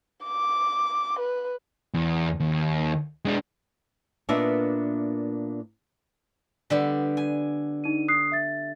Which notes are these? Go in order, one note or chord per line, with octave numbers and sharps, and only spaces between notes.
D6
B4
E2
D#2
G#3 D4
A#2 A#3 B3 D4 D#5 E5
D3 G3 B3
G#5
D#4 D#7
D#6 F#6 C7
E5 A6